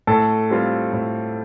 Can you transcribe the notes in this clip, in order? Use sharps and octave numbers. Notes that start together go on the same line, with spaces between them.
A2 A4
G3 C4 F4
A2